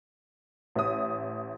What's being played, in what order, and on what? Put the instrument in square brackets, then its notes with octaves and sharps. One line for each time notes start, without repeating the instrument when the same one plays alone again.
[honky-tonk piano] A1 E5 D#6